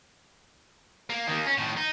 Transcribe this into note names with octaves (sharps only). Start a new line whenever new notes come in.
A#3
D#3 A#3
C#4
A2 D#3
D#4